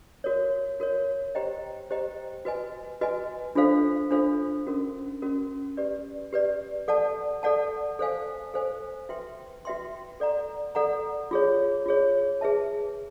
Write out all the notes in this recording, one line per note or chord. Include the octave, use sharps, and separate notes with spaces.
F#4 A#4 C#5
F#4 A#4 C#5
G4 C5 D#5 G5 A#5
G4 C5 D#5 G5 A#5
F#4 B4 D#5 G#5
F#4 B4 D#5 G#5
D4 F4 A4 C5 F5
D4 F4 A4 C5 F5
C#4 F#4 A#4
C#4 F#4 A#4
G4 B4 D5
G4 B4 D5
A4 D5 F#5 A5
A4 D5 F#5 A5
A4 C5 F5 G#5
A4 C5 F5 G#5
F#4 B4 E5 G5 C6
F#4 B4 E5 G5 C6
A4 D5 F#5 A#5
A4 D5 F#5 A#5
F4 G#4 C#5
F4 G#4 C#5
G#4 B4 E5 A5